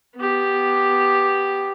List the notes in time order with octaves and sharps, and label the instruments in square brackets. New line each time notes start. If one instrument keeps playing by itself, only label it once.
[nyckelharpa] B3 G4